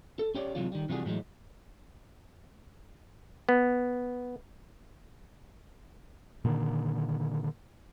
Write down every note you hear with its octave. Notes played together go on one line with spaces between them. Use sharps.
A4
C#4 G4 C#5 D5
C3 E3 F#3 G#3 F4
D#3 G3
C3 E3 F3 G3 F#4 G#4
A2 E3 F#3 G#3
B3
A#2 D3 D#3